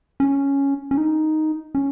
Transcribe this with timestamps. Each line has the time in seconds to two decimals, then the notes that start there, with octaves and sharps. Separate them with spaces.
0.20 C#4
0.91 C#4
0.97 D#4
1.75 C#4